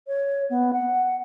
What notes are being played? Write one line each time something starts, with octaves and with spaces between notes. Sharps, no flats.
C#5
B3
F#5